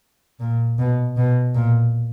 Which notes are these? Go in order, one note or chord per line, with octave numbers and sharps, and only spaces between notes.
A#2
B2
B2
A#2